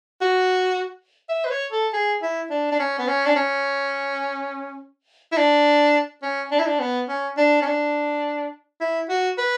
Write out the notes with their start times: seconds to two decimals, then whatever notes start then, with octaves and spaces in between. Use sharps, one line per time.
0.21 F#4
1.29 E5
1.45 B4
1.51 C#5
1.72 A4
1.93 G#4
2.22 E4
2.50 D4
2.72 D4
2.79 C#4
2.99 B3
3.08 C#4
3.25 D4
3.36 C#4
5.32 E4
5.37 D4
6.22 C#4
6.51 D4
6.59 E4
6.67 D4
6.80 B3
7.08 C#4
7.37 D4
7.62 C#4
7.66 D4
8.80 E4
9.09 F#4
9.38 B4